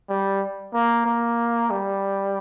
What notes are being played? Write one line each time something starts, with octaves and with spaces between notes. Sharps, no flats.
G3
A#3
A#3
G3